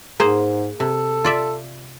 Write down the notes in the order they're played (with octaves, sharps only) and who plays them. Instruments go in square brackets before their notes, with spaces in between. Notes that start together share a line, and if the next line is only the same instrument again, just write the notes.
[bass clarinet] G#2 [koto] A#3 G#4 C5
[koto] C3 [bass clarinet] A4
[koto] F4 D5 E5